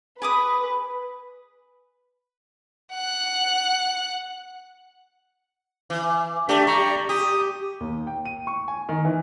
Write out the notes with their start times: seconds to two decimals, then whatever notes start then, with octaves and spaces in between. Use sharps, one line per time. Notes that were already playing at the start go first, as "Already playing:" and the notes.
0.22 G#4 B4 D6 D#6
2.93 F#5 F#6
5.90 E3
6.49 A3 D4 G4
6.67 G3 A#5 C#6
7.09 G4 D#6
7.80 D#2
8.07 G5
8.25 D#7
8.47 C#6
8.68 G#5
8.89 D#3
9.05 E3